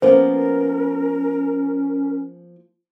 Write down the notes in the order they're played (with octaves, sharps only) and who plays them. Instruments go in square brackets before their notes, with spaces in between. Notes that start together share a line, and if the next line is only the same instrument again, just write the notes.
[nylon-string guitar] F3 A#3 B3 [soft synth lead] C#4 [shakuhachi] A#4 [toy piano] C5